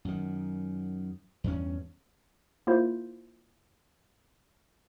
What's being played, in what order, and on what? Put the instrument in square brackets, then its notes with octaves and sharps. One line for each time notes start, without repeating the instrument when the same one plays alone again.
[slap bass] F#2 D#3
E2 G2 C#4
[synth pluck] A#3 E4 F4 C5